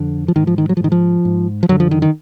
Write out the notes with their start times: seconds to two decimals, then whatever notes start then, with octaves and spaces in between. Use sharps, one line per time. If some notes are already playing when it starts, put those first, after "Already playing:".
Already playing: F2 D3
0.28 F3
0.36 G#2 D#3
0.47 F3
0.58 D#3
0.69 F#3
0.77 F3
0.80 G#2 D#3
0.92 F3
1.25 G#2
1.63 F3
1.69 F#2 D3 F#3
1.80 F3
1.91 D#3
2.02 D#3